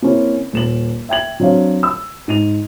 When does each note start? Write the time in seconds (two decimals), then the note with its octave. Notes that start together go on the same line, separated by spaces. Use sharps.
0.02 A#3 C4 C#4 E4
0.53 D#1 E7 F#7
1.09 E5 G5 G#6 F#7
1.40 F#3 C4 D4 C#5 F5
1.83 E6
2.28 G#2 D#7 F7